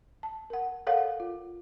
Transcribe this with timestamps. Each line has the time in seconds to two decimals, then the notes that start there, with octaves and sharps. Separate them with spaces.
0.23 A5
0.50 A#4 F#5
0.87 A4 A#4 C#5 F5 F#5
1.20 F4